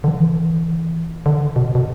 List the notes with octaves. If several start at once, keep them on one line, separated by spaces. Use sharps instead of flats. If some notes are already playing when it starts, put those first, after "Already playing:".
D3
E3
D3
B2
B2